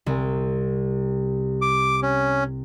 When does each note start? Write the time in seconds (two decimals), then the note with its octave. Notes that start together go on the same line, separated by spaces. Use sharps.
0.06 C2
1.62 D6
2.03 C#4